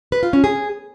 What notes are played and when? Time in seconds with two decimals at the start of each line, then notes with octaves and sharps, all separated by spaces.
0.12 B4
0.23 F4
0.33 C#4
0.44 G#4